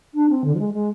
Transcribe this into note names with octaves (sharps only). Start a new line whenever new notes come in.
D4
C4
D3
F3
G#3
G#3